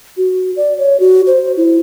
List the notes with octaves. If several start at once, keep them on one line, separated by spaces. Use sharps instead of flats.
F#4
D5
C#5
F#4
C5
E4